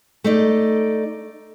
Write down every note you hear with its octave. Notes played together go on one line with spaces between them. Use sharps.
A3 D#4 D5